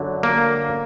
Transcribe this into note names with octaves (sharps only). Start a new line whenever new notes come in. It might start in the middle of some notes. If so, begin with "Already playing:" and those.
Already playing: F#2 D3 F#3
A#3